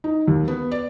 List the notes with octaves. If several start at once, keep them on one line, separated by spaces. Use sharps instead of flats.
D#4
D#2
B3
D5